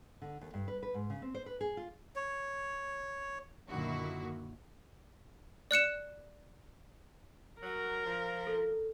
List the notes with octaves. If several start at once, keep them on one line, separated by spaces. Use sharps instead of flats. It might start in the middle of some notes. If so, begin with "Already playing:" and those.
D3
D#2
G2
B4
B4
G#2
C#3
C4
C5
B4
G#4
F4
C#5
F#2 A#2 D3 D#3 E4 F#4
D5 F#6 C#7 E7
F#3 A#4
F3
A4